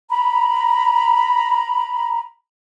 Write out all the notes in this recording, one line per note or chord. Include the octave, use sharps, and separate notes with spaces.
A#5 B5